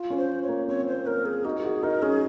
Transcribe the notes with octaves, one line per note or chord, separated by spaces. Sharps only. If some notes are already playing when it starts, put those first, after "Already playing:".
Already playing: F4
C#4 A#4
C5
C#5
A#3
C4 C#5
C5
A#3 A#4
G#4
D#4 F#4
F#4 G#4
D#4 A#4
C#4 G#4